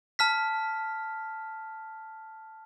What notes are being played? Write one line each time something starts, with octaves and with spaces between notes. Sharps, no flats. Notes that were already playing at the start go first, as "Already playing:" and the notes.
A5 F6 B6